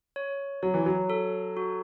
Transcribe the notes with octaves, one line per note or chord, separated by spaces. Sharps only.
C#5
F#3 C#5
E3
F#3
A4
F#4